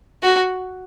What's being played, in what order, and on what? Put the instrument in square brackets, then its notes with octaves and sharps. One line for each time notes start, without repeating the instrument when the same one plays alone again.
[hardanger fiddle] F#4